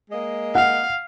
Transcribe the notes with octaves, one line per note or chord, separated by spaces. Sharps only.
G#3 A#3 D#5
F5 F#5